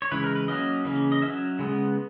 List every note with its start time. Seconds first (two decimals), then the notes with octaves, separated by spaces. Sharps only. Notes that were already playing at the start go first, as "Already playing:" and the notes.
0.02 C#5
0.11 C#3 E3 G#3 B4
0.24 A#4
0.35 B4
0.48 F#3 A#3 C#4 D#5
0.85 C#3 E3 A#3 C#4
1.12 D#5
1.22 F#3 C#4 E5
1.59 C#3 G#3 B3